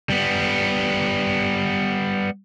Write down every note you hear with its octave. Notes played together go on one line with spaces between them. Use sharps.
G3 B3